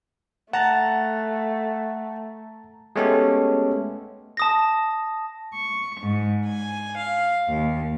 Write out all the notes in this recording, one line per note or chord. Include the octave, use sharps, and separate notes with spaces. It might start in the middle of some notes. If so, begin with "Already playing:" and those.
A3 F#5 A5 A#5 A6
G#3 A3 B3 C#4 G4 A4
A5 D#6 A#6
C#6
G#2
G#5
F5
D#2